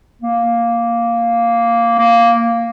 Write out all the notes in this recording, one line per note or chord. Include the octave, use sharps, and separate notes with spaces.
A#3
A#3